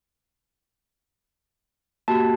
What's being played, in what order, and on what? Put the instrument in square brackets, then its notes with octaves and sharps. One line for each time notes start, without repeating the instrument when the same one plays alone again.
[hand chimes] A#3 F#4 G4 [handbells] A5